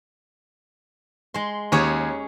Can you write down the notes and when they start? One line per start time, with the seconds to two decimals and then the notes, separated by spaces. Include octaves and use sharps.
1.34 G#3 C6
1.72 D#2 C#4 G#4 C#5